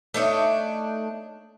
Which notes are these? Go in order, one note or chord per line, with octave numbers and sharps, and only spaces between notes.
A3 D4 D#4 C#5